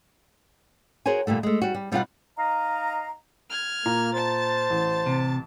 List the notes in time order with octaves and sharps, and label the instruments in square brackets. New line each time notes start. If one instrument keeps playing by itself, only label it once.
[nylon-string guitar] F#4 G#4 A#4 C5 C#5 G#5
A#2 D3 G3 A3
G#3 A3
G3 F#4
G3
B2 G3 D#4 F4 D5 F#5
[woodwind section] D#4 D#5 F5 A#5
[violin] F6 G#6
[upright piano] A#2 A#5 [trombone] A#3
[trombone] C5 [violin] A5 A6
[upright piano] A1
[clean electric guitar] C3